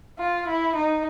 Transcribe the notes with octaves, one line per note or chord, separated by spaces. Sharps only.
F4
E4
D#4